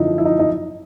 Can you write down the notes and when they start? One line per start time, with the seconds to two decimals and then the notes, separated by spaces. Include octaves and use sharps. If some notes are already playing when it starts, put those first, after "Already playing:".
Already playing: F#2 D3 F3 D#4 E4
0.18 E4
0.25 D#4
0.39 D#4